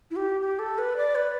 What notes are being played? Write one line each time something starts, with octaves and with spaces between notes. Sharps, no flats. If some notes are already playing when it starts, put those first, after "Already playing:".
E4
G4
G4
A4
B4
D5
B4